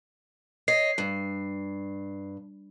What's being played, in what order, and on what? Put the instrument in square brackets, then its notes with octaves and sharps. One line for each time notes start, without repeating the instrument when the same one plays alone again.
[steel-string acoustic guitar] C#5 D#5 [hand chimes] C7
[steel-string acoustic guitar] G2